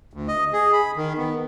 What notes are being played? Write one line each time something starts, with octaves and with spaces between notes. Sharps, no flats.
D2
D#5
G#4
B5
D#3
B3